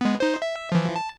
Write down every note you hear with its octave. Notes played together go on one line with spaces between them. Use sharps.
G#3 B3
D#4 C5
E5
E3 F3
A5